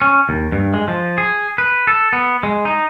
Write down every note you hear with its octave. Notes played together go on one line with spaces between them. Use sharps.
C#4
D#2
G2
G#3
F3
G#4
B4
A4
B3
G#3
D#4